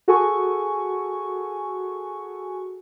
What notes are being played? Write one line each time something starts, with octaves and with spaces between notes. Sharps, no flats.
F#4 G#4 A4 G#5 C#6